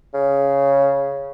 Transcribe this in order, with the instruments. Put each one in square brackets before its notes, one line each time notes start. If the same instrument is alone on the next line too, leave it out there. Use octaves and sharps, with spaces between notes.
[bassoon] C#3